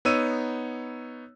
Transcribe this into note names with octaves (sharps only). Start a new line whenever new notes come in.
B3 D#4 C#5 E6 D#7